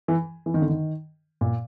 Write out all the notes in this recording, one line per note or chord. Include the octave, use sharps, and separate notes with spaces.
E3
E3
D#3
D3
D#3
A#2